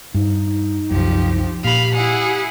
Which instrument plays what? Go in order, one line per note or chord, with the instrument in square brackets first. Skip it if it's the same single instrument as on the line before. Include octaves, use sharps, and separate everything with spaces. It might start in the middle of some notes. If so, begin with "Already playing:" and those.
[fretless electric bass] G2 [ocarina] D#4
[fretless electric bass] C2 F#2 [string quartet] F3 G4
[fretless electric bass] A#2 [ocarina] G4 [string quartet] F5 B5
[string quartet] E4 G#4 F#5